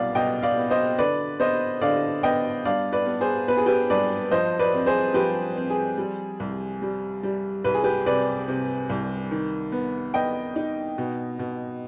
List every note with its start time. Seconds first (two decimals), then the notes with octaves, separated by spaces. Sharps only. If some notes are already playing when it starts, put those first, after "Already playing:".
Already playing: C2 B2 D5 F5
0.15 B2 D#5 G5
0.42 D5 F5
0.57 B3
0.70 C5 D#5
0.98 D3 B4 D5
1.40 B3 C5 D#5
1.81 D3 D5 F5
2.23 B3 D#5 G5
2.65 G2 D5 F5
2.93 B4 D5
3.06 B3
3.21 G#4 C5
3.48 B3 B4
3.57 G#4
3.66 G4 B4
3.90 G2 B4 D5
4.31 F3 C5 D#5
4.59 B4 D5
4.73 C4
4.86 G#4 C5
5.14 F3 G4 B4
5.56 C4
5.70 G#4
5.98 G3
6.40 C2
6.82 G3
7.23 G3
7.64 C2 B4
7.74 G#4
7.84 G4 B4
8.06 C3 B4 D5
8.48 C3
8.90 C2
9.31 D#3
9.72 B3
10.14 B3 D#5 G5
10.56 D#4
10.98 B2
11.39 B2